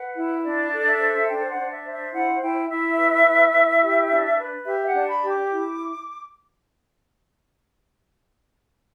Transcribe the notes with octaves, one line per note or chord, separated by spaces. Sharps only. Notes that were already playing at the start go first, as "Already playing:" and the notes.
Already playing: B4 F#5
E4
D4 D5
A4
E5
C5
D4 G5
F#5
D4
E5
C5
E5
E4 F#5
E4 G5
E4 E5
B4
E4
E4
G4
D4
B4
G4 E5
F#5
D4
B5
G4
D6
E4